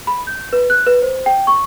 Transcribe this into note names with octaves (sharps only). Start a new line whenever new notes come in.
B5
G6
B4
F#6
B4
C5
G5
C#6